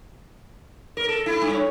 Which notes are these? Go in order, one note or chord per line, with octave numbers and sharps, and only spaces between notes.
A#4
A4
E4
G2
C#5